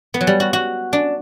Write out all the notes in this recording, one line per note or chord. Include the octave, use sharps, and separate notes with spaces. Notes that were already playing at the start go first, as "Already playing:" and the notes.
B3
F#3
G3
F#4
F#4
D4